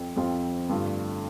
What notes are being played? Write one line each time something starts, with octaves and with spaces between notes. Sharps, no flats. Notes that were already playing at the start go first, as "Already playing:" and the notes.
Already playing: F2 F3 C4 F4
F2 F3 C4 F4
G2 D3 A3 F4